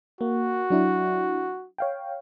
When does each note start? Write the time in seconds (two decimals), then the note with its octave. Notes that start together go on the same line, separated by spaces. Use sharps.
0.21 A#3 F#4
0.70 F#3 D4 E4
1.78 C#5 F5 G5